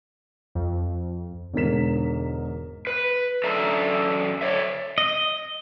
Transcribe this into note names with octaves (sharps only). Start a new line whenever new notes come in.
F2
E1 G#2 D3 A#4 B6 E7
B4
F#2 A4 D5 E5 A#5
C#5 D5 E5
D#5